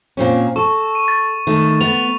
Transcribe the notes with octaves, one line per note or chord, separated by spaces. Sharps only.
A#2 C4 C#4
A4 C#6
D#7
A6
D#3 A3
B3 F7